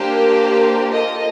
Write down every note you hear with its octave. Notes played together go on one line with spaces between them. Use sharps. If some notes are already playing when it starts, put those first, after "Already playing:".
Already playing: A#3 D4 G4 C5
A#3 F4 A4 D#5